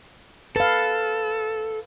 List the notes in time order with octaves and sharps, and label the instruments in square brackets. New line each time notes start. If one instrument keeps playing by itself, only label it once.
[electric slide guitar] A4 [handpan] B4 F5